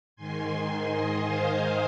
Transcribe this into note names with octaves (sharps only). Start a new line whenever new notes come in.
G#2 D#3 G#5 C6
G#5 C6
D#5 G#5
C5 F5